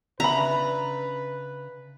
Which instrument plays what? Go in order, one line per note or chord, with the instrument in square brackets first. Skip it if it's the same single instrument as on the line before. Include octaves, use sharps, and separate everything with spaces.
[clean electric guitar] C#3 D4 [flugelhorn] B4 [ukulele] E5 B5 [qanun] A#5